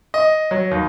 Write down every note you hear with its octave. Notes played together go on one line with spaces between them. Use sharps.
D#5
F#3
D#2